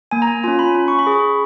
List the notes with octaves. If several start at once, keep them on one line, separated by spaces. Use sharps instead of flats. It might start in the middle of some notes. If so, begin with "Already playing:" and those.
A#3 G#5
A#5
G#5
C#4 F4 G#5
B5
C#4
C#6
B5
G#4
C#6